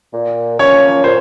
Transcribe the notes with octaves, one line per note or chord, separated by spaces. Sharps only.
A#2
F3 A#3 C#4 C#5
A#2 C5